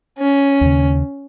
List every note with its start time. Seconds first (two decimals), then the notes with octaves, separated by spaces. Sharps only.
0.19 C#4
0.61 D#2 C#3